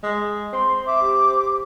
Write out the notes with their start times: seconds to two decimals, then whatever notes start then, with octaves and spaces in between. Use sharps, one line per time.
0.03 G#3
0.53 C4 C6
0.87 E5 D6
1.01 G4